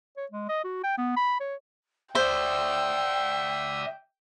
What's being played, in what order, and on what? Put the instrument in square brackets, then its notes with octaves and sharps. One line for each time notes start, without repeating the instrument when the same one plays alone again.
[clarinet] C#5
G#3
D#5
F#4
G5
B3
B5
C#5
[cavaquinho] C5 [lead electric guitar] D5 E5 [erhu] G5 [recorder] E6